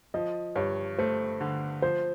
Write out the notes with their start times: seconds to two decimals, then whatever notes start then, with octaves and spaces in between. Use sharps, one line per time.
0.14 F3 D#5
0.56 G2 C#5
0.98 A3 C5
1.41 D3
1.82 F3 C5